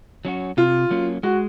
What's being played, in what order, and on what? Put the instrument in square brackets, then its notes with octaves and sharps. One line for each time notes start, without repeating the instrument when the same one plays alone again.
[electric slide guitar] F#3 C#4 F#4
[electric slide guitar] C3 [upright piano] F4
[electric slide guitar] F#3 A#3 C#4
[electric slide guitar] G#3 [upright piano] F#4